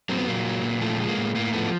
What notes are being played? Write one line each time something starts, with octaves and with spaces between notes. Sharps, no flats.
F#3 A#3 C4
B3
A#2 A#3
F#3
A#2
F3 A3
G#3
A#3
A2
A2 A#3
F3 A3 B3